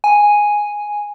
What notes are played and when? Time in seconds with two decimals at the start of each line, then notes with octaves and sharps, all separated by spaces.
0.04 G#5